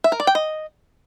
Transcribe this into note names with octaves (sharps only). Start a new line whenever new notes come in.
E5
A#4
D5
G5
D#5